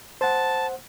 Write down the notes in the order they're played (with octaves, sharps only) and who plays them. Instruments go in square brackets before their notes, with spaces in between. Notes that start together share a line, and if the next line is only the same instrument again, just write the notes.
[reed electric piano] C5 F#5 [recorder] A5